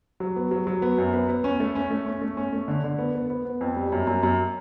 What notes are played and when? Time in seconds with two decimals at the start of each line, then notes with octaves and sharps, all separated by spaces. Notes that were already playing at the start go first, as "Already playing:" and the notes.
0.20 F#3
0.36 B3
0.51 F#3
0.67 F#3
0.82 B3
0.98 F#2
1.13 B3
1.29 B3
1.44 C#4
1.60 A3
1.75 C#4
1.91 A3
2.06 C#4
2.21 A3
2.37 C#4
2.53 A3
2.68 D3
2.84 D3
2.98 B3
3.15 B3
3.30 B3
3.45 B3
3.61 F2
3.76 G3
3.92 F#2
4.07 F#2
4.23 F#2